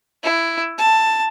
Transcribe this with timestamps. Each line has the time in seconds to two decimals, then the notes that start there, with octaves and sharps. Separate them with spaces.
0.23 E4
0.78 A5